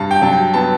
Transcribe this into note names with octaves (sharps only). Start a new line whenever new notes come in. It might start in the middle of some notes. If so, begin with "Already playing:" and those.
Already playing: G2 A5
G5
F#3 A5
G5
B3 A5